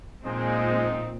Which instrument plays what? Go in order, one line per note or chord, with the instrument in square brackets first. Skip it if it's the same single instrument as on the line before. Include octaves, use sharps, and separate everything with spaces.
[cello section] A#2 C4 [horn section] F3 D#4 [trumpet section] G#3